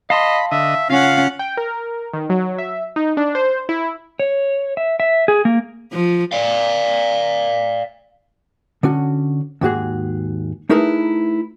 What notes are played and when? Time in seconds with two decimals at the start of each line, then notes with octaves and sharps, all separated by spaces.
0.10 D#5 F5 A5 B5 C6
0.51 D3 D#5 E5
0.90 C#3 C#4 F4 F5 F#5
1.39 G5
1.57 A#4
2.13 D#3
2.30 F#3
2.58 E5
2.96 D#4
3.17 D4
3.35 C5
3.69 E4
4.20 C#5
4.77 E5
5.00 E5
5.28 G#4
5.45 A#3
5.92 F3
6.33 D5 F5
8.83 D3 C#4 F#4
9.61 D#2 G#2 F#4 G#4
10.69 A3 D#4 E4 G#4 A#4 B4